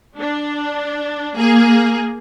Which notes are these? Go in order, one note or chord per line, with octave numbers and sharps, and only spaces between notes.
D4
A#3 G#4